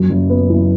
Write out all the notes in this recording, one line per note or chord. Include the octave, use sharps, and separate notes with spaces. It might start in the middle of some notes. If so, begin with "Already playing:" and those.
Already playing: F#2
F#1
B3
E3